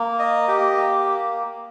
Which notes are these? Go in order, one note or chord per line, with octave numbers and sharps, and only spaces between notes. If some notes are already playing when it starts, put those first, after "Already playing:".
Already playing: A#3
D#5
G4
A#3